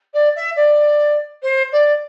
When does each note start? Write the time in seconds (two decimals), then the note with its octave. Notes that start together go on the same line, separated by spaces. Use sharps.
0.14 D5
0.36 E5
0.56 D5
1.42 C5
1.72 D5